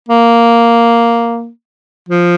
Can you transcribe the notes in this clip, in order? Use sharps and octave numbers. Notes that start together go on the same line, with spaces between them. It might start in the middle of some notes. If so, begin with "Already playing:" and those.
A#3
F3